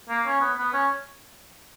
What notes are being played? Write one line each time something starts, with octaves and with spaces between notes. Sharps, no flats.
A#3
C#4
B3
B3
C#4